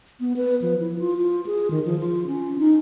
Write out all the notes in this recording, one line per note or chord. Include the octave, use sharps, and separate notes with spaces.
B3
B4
F3
E4
F4
F4
G#4
D#3
F3
F4
C#4
D#4